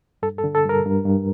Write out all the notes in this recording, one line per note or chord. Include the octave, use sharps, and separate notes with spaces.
G2 A4
A4
D3
A4
G2 A#4
G2
G2